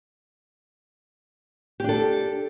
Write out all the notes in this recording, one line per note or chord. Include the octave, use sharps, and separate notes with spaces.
D4 G4 A4